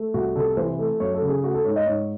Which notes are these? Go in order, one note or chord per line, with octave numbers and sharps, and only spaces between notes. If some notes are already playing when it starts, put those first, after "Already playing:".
Already playing: A3
C2 F#4
C3 A4
E3 C5
A3
F#2 C#5
A4
C#3
G#4
A3 F#4
A4
G#2 C#5
D#5
G#2 C#5